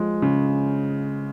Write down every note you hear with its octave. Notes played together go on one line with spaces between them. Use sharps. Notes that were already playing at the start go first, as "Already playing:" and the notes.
Already playing: F3 G#3
C#3